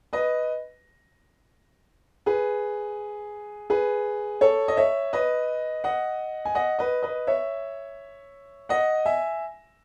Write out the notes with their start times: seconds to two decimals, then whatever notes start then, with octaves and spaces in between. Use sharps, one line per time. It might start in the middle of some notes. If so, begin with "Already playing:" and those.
0.13 B4 D#5
2.26 G#4 B4
3.70 G#4 B4
4.41 A4 C#5
4.68 D#5
4.77 C#5 E5
5.13 B4 D#5
5.84 D#5 F#5
6.45 G#5
6.55 D#5 F#5
6.79 B4 D#5
7.03 B4 D#5
7.27 C#5 E5
8.69 D#5 F#5
9.06 E5 G#5